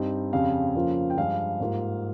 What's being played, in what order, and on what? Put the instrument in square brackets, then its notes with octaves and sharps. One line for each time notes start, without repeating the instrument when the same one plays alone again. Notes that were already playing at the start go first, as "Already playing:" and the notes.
Already playing: [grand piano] G2 G3 C4 D#4
F2 C#3 G3 C4 F5
F2 C#3 F3 A#3 F4
G5
G2 F3 G#3 F5
G#2 G3 A#3 F4